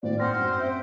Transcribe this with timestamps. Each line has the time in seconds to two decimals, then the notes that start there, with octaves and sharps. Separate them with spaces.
0.03 G#1 A2 C5 D5
0.20 C4 C5 F#5 C6 F6 A#6
0.39 F#2
0.59 E5 G5